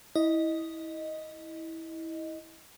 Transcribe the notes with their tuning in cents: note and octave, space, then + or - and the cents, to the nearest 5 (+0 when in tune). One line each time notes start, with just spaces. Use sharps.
E4 -20 D#5 +0